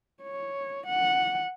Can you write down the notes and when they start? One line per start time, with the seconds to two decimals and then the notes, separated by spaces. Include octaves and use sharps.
0.23 C#5
0.86 F#5